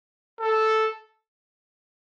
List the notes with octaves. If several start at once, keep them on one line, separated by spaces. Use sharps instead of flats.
A4